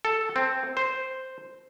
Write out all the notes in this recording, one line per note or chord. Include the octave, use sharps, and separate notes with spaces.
A4
C4
C5